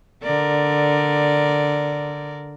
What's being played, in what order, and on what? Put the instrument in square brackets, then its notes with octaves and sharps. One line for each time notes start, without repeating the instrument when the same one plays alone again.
[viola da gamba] D3 A#4 D5